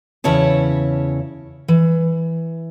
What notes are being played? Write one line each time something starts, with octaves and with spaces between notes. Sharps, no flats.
E2 C#3 E4 C#5 A5
E3